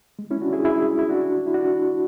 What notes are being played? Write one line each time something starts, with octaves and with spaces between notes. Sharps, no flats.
G#3
C#4 E4
D4 F#4
E4 G#4
E4 G#4
E4
D4 F#4
E4
D4 F#4